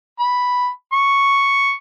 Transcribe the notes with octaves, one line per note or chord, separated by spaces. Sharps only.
B5
C#6